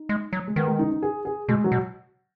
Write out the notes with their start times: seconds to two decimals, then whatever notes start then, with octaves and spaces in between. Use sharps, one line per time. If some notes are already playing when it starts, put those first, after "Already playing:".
Already playing: D#4
0.09 G#3
0.33 F#3
0.47 G#3
0.56 D#3 B3
0.67 G#3
0.79 D#4
0.91 D#4
1.02 G#4
1.25 G#4
1.49 B2 G#3
1.64 F#3
1.72 B2